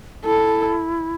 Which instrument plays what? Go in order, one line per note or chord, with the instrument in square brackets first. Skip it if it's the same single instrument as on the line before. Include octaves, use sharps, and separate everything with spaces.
[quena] E4 [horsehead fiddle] A4